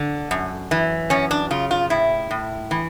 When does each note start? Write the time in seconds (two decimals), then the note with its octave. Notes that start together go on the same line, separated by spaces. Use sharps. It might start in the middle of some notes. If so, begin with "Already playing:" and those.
Already playing: D3
0.31 F#2
0.71 E3
1.10 F#2 C#4
1.31 D4
1.51 C#3 F4
1.71 F4
1.90 A2 E4
2.31 A2
2.71 E3